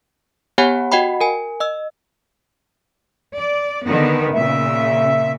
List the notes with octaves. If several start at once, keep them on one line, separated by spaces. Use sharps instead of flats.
B3 G4 C#5 F#5 G#5 B5
F#4 D#5 F#5 G5 B5
A#4 G#5
D#5 E6
D5
D3 D#3 B3
A#2 C#3 E5